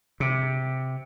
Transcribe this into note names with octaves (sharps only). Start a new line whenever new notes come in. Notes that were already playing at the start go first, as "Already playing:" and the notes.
C3